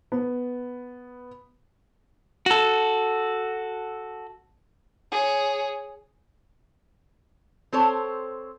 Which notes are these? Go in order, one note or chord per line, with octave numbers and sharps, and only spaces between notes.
B3
F#4 A4
G#4 C#5
C4 A4 C5 C#5